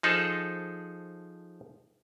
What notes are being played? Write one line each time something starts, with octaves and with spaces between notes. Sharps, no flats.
F3 D#4 G#4 A4 C5